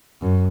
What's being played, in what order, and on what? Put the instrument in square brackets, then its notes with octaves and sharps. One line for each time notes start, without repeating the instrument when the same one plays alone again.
[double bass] F#2